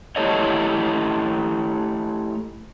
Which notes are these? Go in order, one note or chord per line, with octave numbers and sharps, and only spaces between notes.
A3 E4 G4 A4 C#5 D#5